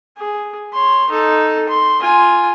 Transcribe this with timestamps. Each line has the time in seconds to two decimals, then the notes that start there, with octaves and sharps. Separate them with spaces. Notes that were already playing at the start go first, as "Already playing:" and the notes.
0.17 G#4
0.73 C#5 C6
1.10 D#4 A4
1.69 C6
2.00 F4 G#5